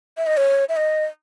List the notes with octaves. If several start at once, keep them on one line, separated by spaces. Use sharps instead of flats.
E5
D#5
C#5
E5
D#5